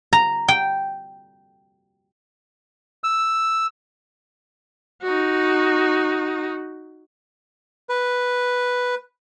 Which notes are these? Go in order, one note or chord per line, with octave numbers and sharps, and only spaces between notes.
A#5
G5
E6
D#4 F#4
B4